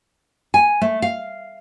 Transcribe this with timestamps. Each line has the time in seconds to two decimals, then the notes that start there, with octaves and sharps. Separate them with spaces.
0.54 G#5
0.81 A3
1.02 F5